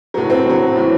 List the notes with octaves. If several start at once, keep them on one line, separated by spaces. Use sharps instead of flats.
A2 F#3
C4
A2 F#3
A2 E3